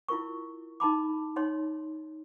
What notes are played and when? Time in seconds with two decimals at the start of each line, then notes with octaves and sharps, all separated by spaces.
0.08 E4 F4 A#4 C#6
0.80 D#4 A5 B5 D6
1.36 D#4 C#5 C6